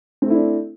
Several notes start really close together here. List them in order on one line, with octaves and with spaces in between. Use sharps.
C4 A3 E4 D4